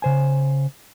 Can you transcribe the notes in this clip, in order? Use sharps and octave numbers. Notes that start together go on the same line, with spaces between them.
C#3 C5 G#5